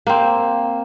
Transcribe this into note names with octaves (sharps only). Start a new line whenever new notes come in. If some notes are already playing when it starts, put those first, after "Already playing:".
A#3 C4